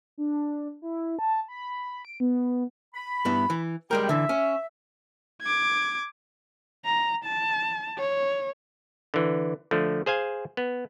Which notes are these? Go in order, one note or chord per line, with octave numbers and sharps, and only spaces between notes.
D4
E4
A5
B5
D7
B3
B5
G2 B3 E4
E3
G3 G#3 A#4 G5
D3 E3 E5
C#4
D6 G#6
A#5
A5
C#5
D3 E3
D3 F3 A3
G#4 C5 F5 G#5
B3